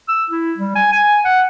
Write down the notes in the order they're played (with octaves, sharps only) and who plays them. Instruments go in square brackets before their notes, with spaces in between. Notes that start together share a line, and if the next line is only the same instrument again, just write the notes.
[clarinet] E6
E4
G3
G#5
G#5
F#5